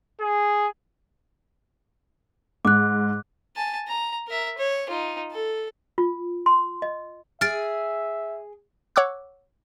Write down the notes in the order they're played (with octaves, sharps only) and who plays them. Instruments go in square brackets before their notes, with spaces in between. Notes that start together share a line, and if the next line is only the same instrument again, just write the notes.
[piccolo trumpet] G#4
[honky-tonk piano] G#2 [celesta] D6 F#6
[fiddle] G#5 A5
A#5
A#4 E5
C#5
D#4 F4
A4
[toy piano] F4
C6
D#5
[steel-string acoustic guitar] G#4 G#5 [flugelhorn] E5 [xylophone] F6 A6 D7
[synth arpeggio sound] C#5 F#5 C#6 D6 E6 F#6